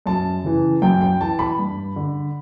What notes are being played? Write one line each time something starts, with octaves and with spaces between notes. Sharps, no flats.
F#2 A5
C#3 E3
F#2 G5
G5
E3 A5
B5
G2
D3